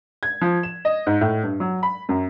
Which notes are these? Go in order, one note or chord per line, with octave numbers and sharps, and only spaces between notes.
G#6
F3
E7
D#5
G#2
A2
G2
F#3
B5
F#2